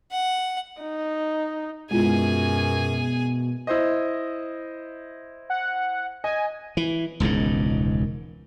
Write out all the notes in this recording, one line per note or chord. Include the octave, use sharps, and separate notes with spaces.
F#5
D#4
F#2 B2 G#3 E4 F4 G#4 G#5
E4 C5 D#5
F#5
D#5 G#5
E3
E1 C#2 G#2 D#3